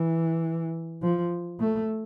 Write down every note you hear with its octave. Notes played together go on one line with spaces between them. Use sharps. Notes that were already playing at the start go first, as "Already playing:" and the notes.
Already playing: E3
F3
A3